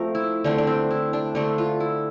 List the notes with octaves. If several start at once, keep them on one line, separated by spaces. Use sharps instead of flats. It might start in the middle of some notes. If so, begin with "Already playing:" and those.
Already playing: F3 A3 C4 A#4
E4
D3 A3 C4 D4
D4
C4
E4
D4
D3 A3 C4 D4
F4
E4